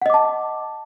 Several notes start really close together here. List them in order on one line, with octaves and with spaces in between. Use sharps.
F#5 D#5 D6 A5